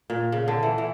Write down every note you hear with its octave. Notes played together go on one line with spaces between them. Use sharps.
A#2
C#3
D3
E3
E3